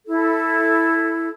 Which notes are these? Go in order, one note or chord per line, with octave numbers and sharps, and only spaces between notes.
E4 A4